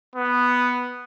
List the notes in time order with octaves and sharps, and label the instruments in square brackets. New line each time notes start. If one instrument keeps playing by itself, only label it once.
[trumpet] B3